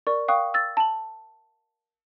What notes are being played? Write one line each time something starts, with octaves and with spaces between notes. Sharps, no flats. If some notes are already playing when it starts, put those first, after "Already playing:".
A#4 D5 C#6
F5 G5 C#6 D#6 F#6
E6 A6
A5 F#7